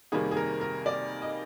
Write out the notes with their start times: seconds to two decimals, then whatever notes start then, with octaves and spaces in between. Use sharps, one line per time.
0.12 F2 C3 D#3 G3 A#3 G#4
0.31 G#4
0.37 A#4
0.61 A#4
0.86 D5
1.22 D#5